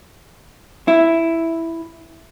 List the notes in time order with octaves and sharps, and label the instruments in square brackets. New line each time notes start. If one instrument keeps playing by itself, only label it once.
[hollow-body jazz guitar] E4